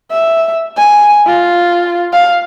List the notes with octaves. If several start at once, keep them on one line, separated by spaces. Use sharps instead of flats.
E5
G#5
F4
F5